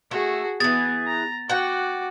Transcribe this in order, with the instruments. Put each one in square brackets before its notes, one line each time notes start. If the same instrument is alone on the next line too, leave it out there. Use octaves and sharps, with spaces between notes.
[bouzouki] A3 [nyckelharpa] F#4 G#4
[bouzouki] E3 G#4 [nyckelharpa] B3 [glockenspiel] A6
[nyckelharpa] A#5
[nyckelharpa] F#4 D6 [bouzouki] F#5 G5